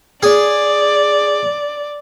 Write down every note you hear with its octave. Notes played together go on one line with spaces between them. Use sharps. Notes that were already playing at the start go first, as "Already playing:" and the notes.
G#4 D5